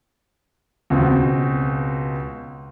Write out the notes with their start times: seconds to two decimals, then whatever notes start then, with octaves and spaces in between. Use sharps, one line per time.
0.90 C#2 B2 C4